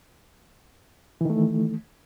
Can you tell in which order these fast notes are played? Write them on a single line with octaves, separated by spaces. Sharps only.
E3 D#3 A3